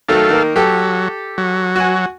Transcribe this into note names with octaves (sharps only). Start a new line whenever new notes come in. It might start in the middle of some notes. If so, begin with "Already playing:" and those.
D#3 F#3 A3 A4 F5
D#3 A#3
F#3 G4 A4
F#3
F#4 G#5